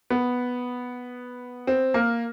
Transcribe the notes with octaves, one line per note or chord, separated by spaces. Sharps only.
B3
C4
A#3